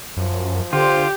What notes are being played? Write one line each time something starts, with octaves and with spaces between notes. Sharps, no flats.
F#2 F3
D3 F4 G4 C5